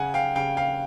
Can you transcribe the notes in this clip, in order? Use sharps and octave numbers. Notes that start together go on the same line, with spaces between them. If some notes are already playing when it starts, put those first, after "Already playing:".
Already playing: C#3 F#5 G#5
F5 G5
C#3 F5 G5
F5 G5